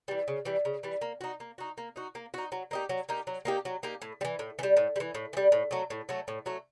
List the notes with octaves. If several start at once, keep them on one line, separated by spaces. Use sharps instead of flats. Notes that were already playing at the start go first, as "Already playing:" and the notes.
E3 G3
C#3
E3 G3
C#3
E3 G3
A#3
D#4 F#4
A#3
D#4 F#4
A#3
D#4 F#4
A#3
D#4 F#4
F#3
A#3 D#4 G4
F#3
A#3 D#4 G4
F#3
A#3 D#4 G4
F#3
A#3 D#4 G4
A2
G3
E3
A2
E3
G3
A2
G3
E3
A2
E3
G3
A2
F#3 A3
A2
F#3 A3
A2
F#3 A3